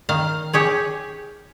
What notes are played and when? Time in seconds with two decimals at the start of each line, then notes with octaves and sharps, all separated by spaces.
0.09 D#3 F5
0.53 G4 G#4 C#5